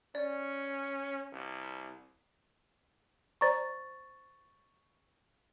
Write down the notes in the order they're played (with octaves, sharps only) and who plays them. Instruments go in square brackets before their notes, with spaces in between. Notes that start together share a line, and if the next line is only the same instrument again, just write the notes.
[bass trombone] C#4 [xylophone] D5
[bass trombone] C2
[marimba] C5 D5 A#5 [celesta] C#6 A6